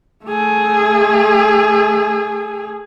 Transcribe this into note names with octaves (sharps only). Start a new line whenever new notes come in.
A3 G#4